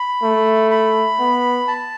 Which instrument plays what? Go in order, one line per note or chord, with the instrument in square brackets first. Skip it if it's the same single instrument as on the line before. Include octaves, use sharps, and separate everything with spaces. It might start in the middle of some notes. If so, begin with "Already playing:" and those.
Already playing: [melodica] B5
[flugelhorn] A3
[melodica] B5
[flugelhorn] B3
[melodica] A5